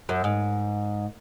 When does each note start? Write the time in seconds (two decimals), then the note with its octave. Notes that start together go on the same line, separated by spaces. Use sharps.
0.09 F#2
0.24 G#2